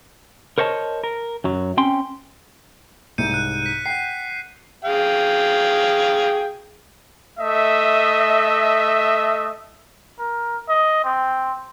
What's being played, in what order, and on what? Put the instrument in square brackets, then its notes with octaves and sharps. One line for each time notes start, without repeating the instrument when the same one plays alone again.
[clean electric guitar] A#4 C5 C#5 D#5 A5
A#4
F#2 F#3
C4 C#4 G5 C6
[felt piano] C2 G#2 [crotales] G6 C#7 D#7
[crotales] F#6 G6 D#7
F#6 B6
[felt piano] F#5 G5 [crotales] C7
[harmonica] G#4 F5 G5
[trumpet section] A3 D#5 E5
[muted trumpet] A#4
D#5
C4